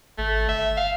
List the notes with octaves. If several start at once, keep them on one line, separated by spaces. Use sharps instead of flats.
G#1 A3
G1 E5
F5